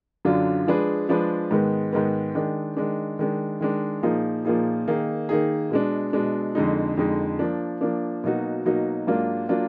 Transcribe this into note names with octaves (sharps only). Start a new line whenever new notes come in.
F#2 D3 F#3 D4 F4
F3 G#3 D4 G#4 B4
F3 G#3 D4 G#4 B4
G#2 D#3 G#3 B3
G#2 D#3 G#3 B3
D#3 G#3 D4
D#3 G#3 D4
D#3 G#3 D4
D#3 G#3 D4
A#2 F3 A#3 D#4 G#4
A#2 F3 A#3 D#4 G#4
D#3 A#3 D#4 G#4
D#3 A#3 D#4 G#4
B2 G#3 D4
B2 G#3 D4
F2 D3 G#3 D#4
F2 D3 G#3 D#4
F3 A#3 D4
F3 A#3 D4
B2 F#3 A#3 D#4 F#4
B2 F#3 A#3 D#4 F#4
G#2 F#3 A#3 D4 F4
F#3 A#3 D4 F4